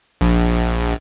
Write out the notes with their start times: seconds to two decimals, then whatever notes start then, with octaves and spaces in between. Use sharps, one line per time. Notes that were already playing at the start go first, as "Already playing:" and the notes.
0.21 A#1